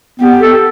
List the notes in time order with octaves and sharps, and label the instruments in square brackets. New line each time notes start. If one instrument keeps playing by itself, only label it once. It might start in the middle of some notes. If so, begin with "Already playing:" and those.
[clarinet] B3 [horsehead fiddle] G4
[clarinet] A4